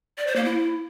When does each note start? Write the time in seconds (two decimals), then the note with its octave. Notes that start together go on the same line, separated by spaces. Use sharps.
0.18 D5
0.27 C5
0.36 A#3
0.45 E4